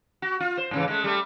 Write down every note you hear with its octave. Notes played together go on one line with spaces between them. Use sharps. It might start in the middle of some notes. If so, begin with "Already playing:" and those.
F#4
F4
C5
G#2 C#3 E3
G#3 A3
G3 A3